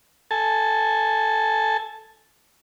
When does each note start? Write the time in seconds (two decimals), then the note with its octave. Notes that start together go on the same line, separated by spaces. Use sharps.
0.31 A4 G#5 A5